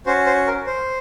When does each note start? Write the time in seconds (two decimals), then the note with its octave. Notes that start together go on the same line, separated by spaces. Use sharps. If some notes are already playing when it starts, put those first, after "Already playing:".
0.06 C#4 F#4 C5
0.26 C5
0.47 A#4
0.67 C5